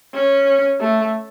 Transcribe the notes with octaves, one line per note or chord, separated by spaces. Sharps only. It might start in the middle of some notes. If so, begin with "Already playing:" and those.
C#4
A3